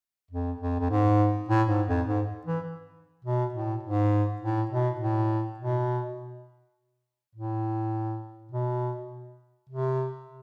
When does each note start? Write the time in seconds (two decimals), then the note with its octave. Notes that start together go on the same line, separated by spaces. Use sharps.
0.31 F2
0.61 F2
0.80 F2
0.90 G#2
1.49 A2
1.68 G#2
1.88 F2
2.07 G#2
2.46 E3
3.25 B2
3.54 A2
3.83 G#2
4.42 A2
4.71 B2
5.01 A2
5.59 B2
7.35 A2
8.52 B2
9.69 C3